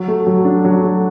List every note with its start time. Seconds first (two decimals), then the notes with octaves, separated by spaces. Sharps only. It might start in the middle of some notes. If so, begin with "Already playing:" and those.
Already playing: F#3
0.08 A3
0.27 F#3
0.45 D4
0.65 F#3
0.83 A3